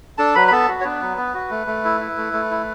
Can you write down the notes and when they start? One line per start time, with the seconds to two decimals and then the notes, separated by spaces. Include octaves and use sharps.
0.18 D4 A4 A5
0.35 F#3 B4 B5
0.48 B5
0.51 B3 A4 A5
0.68 F#4
0.81 C#5
0.85 B3 D4 B4
1.02 F#3
1.17 B3
1.34 F#4
1.50 A3
1.67 A3
1.85 E4
2.01 E4
2.17 A3
2.33 A3
2.51 E4